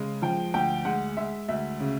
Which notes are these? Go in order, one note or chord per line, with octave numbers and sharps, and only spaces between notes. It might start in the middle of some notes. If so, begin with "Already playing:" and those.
Already playing: C#3 G#3
F3 G5
D2 G5
G#3 F#5
G#3 E5
D2 E5
C#3